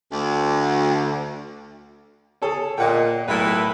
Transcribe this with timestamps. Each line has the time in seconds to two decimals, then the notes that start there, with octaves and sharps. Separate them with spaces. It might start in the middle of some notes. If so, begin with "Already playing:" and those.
0.11 D2
2.42 G#4 A4 C#5
2.78 A#2 D#5 F#5 G5
3.28 B1 A2 E4 A#4 B4